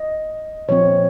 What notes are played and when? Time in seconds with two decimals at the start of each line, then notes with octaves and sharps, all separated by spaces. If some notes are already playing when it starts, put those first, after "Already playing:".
Already playing: D#5
0.68 A#2 F3 C4 C#5